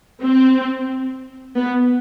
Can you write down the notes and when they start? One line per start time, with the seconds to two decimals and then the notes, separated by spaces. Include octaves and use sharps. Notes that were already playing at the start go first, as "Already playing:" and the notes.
0.23 C4
1.58 B3